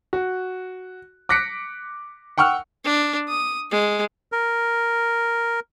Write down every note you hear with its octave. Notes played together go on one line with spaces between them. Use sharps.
F#4
D6 F#6 A#6 B6 C#7 D7
F#5 G5 C#6 E6 F6
D4
D#6
G#3
A#4